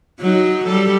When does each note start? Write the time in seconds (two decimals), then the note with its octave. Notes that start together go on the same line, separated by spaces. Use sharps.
0.20 F#3 D#4
0.67 G3 A4